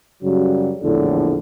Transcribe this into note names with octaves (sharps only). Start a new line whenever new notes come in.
F#2 C#3 F#3 G3
A#1 E2 A2 D3